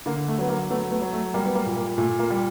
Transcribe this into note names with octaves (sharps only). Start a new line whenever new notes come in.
D3 A#3
A3
F#3 B3
A#3
F#3 A3 B3
A3 B3
F#3
A3
G3 A#3
B3
A#3
A#2
A#3
A#2 A3
A#3
G3